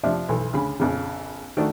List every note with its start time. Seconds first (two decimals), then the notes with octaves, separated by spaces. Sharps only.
0.04 C3 F3 D4 E5
0.29 B1 E3 A4
0.53 D2 C#3 B5
0.80 A#1 F2 C#3
1.57 D#3 A3 D4 F#4